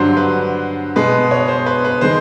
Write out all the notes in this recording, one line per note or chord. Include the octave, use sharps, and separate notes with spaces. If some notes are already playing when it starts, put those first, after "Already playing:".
Already playing: G2 D3 F#3 C5
B4
B2 G#3 B4
C#5
C5
B4
B4
D#3 G#3 C5